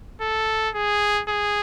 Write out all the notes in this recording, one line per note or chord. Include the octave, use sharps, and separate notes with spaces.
A4
G#4
G#4